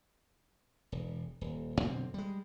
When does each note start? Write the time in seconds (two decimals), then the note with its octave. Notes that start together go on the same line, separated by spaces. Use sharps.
0.92 E1
1.41 D#1
1.80 F#2 B2 D3 C4
2.14 G3 G#3